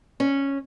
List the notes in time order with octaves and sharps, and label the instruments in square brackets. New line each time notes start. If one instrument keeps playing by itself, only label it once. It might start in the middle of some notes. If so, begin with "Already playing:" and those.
[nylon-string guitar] C#4